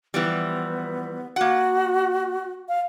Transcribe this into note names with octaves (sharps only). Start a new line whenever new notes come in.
E3 F3 G3 B3
A#3 F#4 F#5
F5